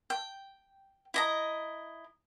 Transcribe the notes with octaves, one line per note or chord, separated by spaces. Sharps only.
G5
E4 D#5 A#5